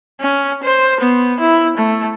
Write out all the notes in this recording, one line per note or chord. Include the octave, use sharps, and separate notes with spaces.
C#4
C5
B3
E4
A3